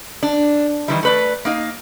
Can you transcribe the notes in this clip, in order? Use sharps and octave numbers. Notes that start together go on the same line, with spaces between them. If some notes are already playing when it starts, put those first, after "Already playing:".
D4
D#3 E3 G3
A3 B4 D5
A#3 D#4 F5